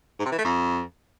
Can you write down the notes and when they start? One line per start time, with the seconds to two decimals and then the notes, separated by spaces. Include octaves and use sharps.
0.19 G#2
0.26 C3
0.32 E3
0.38 A3
0.45 F2